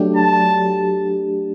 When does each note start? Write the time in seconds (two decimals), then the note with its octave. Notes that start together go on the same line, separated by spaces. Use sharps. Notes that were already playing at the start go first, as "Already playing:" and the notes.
Already playing: F#3 A3 D4 G4
0.16 A5